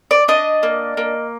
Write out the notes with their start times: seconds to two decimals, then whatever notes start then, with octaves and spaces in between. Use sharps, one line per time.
0.11 D5
0.28 D4 D#5
0.63 A#3
0.97 A#3